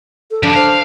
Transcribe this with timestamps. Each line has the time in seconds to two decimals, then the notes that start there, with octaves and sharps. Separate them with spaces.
0.31 A4
0.43 F3 G3 D4
0.55 C5 F5